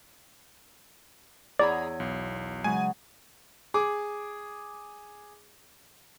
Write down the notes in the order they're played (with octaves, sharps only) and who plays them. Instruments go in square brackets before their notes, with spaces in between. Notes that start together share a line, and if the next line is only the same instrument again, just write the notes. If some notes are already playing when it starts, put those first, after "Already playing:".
[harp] E2 C#5 E6 [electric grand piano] G#4 A#5 B5 [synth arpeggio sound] D5
[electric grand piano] B1
[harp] C#3 F#3 G#3 [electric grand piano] G#5
[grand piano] G#4 D6